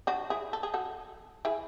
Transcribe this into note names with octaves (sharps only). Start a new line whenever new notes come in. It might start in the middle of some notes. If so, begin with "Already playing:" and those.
D4 F#4
E4 G#4
A4
G#4
F#4 A4
E4 G#4